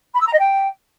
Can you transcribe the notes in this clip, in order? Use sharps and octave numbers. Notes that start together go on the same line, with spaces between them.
B5
E6
A#5
D#5
G5